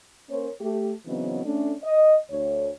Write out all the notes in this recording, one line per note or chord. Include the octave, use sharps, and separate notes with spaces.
A#3 C#4 A#4 C5 C#5
A3 G4
C#3 E3 F#3 B3 C4 D#4
A3 C#4 D4
D#5
D2 C#5